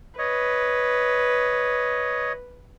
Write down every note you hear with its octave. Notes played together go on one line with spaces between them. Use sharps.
B4 C#5 D#5